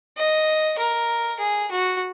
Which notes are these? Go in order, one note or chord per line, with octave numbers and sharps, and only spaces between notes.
D#5
A#4
G#4
F#4